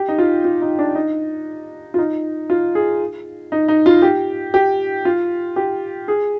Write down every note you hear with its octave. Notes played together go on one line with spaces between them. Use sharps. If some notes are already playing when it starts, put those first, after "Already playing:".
Already playing: G4
D#4
F4
F4
D#4
D4
D#4
F4
D#4
F4
G#4
D#4
D#4
F4
G4
G4
F4
G4
G#4